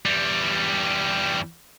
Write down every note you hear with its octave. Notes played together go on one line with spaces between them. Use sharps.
E2 G3